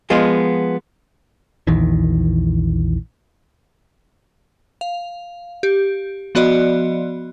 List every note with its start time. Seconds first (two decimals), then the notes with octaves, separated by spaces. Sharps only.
0.10 F3 G#3 B3 F4
1.67 A#1 E2 D#3 E3
4.81 F5
5.63 G4
6.35 F3 B3 F#4 D5 D#5